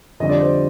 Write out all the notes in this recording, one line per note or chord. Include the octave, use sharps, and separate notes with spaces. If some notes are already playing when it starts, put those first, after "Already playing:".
F2 D3 G3 D#5
D5
C5